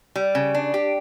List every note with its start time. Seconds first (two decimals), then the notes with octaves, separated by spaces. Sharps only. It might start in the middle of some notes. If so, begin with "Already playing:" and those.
0.16 G3
0.35 C#3
0.55 D4
0.74 G4